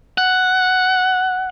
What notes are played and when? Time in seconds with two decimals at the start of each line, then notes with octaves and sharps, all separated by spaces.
0.18 F#5